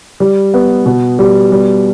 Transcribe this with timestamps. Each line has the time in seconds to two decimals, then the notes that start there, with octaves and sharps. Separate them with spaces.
0.20 G3
0.54 B3
0.86 B2
1.19 G3
1.52 G3